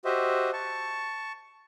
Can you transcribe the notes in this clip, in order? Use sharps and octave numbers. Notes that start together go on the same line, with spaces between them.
F#4 G4 C5 D#5 E5
A5 C#6